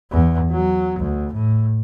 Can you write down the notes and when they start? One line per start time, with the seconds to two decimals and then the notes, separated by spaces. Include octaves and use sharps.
0.11 E2
0.51 F#3
0.99 D2
1.33 A2